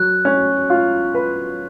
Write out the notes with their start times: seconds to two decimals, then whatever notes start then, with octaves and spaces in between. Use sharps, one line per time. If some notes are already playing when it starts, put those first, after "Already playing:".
Already playing: F#3 F#6
0.25 C#4
0.70 F4
1.15 B4